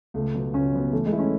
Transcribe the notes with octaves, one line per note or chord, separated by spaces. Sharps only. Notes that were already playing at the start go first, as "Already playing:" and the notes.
C#2 A3
B2 F#3 B3
C#2 C#4
B2 F#3 B3
E3 A3
G#3
A3 E4
C#4